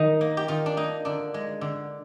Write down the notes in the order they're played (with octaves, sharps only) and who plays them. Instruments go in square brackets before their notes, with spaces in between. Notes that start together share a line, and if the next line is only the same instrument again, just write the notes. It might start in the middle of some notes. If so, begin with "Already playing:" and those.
Already playing: [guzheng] D#3 D#4
A#3
G4
D#3 F4
D4
A#3 D#4
D3 D4
G#3
D3